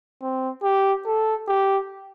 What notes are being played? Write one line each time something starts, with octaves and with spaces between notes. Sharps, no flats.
C4
G4
A4
G4